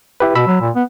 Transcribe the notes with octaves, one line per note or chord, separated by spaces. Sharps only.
E4 G4 B4
B2 B5 E6
F#3
A#2
B3